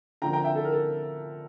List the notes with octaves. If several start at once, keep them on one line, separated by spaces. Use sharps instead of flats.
D3 F3 A#3 G5 A#5
G5 A#5
E5 G5
A4
A#4
A4